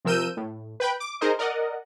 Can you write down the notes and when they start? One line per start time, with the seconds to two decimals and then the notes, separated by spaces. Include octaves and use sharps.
0.05 C3 F3 A#4 E6 G6 D#7
0.37 A2
0.80 B4 G5 B5
1.00 D6
1.21 D#4 G#4 A#4 C5 D#5
1.39 A#4 D5 D#5 F#5